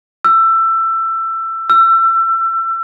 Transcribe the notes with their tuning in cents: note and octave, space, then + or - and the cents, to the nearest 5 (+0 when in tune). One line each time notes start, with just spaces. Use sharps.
E6 +20
E6 +30